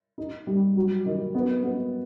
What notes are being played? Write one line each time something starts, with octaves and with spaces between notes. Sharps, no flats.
D#4
G3
F#3
D#3
B3
B3